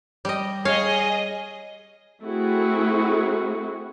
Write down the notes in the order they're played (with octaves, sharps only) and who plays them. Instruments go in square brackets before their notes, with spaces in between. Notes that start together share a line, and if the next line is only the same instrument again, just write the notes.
[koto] G3 D#5
[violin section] G#4 D#5 [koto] C#5 F5
[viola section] A3 C4 E4 F#4 G#4